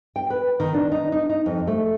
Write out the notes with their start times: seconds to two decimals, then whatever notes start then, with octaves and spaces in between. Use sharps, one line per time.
0.16 G5
0.30 B4
0.60 D#3
0.74 D4
0.92 D#4
1.12 D#4
1.29 D#4
1.46 F2
1.67 A3